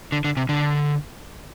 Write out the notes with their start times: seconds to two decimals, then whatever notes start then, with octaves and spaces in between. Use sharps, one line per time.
0.12 D3
0.24 D3
0.37 C3
0.49 D3